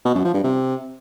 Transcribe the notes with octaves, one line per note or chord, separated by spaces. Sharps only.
B2
F#2
F3
G2
C3